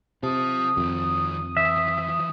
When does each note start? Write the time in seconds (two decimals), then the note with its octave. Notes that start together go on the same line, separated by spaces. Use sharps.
0.23 C3 F4 A5 D#6
0.77 F2 D#3 C4
1.57 E3 F3 E5